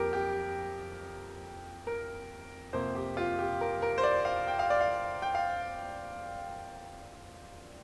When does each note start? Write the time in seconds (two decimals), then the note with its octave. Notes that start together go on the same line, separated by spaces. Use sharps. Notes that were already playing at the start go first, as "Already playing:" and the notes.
Already playing: F2 F3 A#3 G4 A#4
0.13 G4
1.87 A#4
2.73 F2 C3 A#3 C5
2.95 G4
3.17 F4
3.39 G4
3.61 A#4
3.82 A#4
3.98 C5
4.03 D5
4.25 F5
4.48 G5
4.59 F5
4.70 D5
4.81 F5
5.22 G5
5.35 F5